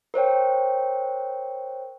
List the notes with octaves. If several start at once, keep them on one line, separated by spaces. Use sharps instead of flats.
A#4 C5 C#5 G5